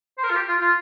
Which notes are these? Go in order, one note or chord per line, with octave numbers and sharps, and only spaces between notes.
C5
A#4
F4
G4
F4
F4